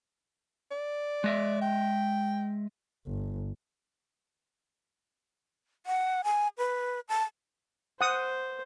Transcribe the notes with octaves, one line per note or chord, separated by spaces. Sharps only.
D5
G#3 D#5 E5
G5
G1
F#5
G#5
B4
A5
C5 F#5 D#6